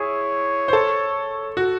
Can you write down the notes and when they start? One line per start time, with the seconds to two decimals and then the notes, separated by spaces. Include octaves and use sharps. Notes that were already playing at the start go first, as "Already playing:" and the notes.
Already playing: E4 G#4 C#5
0.68 C5
0.73 A4
1.57 F#4